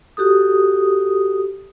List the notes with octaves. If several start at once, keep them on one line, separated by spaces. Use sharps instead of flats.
F#4 G4 A4 D#6